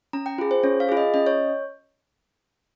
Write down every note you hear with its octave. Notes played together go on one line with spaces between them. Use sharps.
C#4 A#5
G5
F4 G#4
C5
C#4 C#5
F5
F4 G#4
D#5
C#4 D#5
C#5